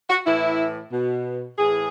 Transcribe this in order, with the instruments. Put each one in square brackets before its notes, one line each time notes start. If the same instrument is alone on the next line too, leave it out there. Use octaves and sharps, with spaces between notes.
[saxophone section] F#4
A2 E3 E4
B2
A2 E3 G#4